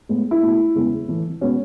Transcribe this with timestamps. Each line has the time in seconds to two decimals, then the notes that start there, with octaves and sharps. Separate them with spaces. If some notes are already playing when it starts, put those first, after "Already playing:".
0.09 A2 G#3 B3
0.31 E4
0.42 B2 A3
0.75 E2 C#3 G#3 B3
1.08 A2 E3 A3
1.41 B2 G#3 B3 C#4